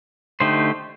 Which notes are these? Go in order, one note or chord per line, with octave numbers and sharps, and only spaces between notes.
D3 A3 D#4 G4 C5